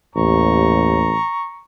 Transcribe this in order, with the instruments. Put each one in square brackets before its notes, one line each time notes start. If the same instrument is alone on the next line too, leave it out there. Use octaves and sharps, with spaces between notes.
[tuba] A1 [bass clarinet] D#2 [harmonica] A#5 C#6